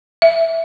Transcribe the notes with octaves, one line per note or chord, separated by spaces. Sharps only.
E5